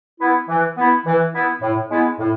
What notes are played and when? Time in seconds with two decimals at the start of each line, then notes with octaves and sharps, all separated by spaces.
0.21 B3 E4
0.49 E3
0.77 B3 E4
1.06 E3
1.34 B3 E4
1.62 A2
1.90 G#3 B3 E4
2.19 A2